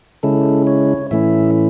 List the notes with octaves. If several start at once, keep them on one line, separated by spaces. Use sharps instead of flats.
C#3 G#3 C#4 E4 A4
C#5
A2 E3 A3 C#4 E4 E5